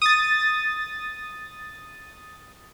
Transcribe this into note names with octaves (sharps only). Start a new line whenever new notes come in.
D#6 A6